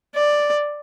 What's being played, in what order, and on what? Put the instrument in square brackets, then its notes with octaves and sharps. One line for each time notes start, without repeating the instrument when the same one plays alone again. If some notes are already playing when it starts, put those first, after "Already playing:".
[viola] D5